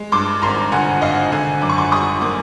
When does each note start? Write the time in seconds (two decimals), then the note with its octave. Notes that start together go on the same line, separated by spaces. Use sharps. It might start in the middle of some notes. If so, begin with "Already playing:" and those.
Already playing: G#3
0.12 G2 C6 D6
0.42 G#1 A#5 C6
0.72 D3 F#5 G#5
1.02 G#1 D#5 F5
1.32 D3 F#5 G#5
1.61 F#2 D6
1.69 C#6
1.78 C6 D6
1.92 G3 C#6 D#6
2.21 A#3 C6 D6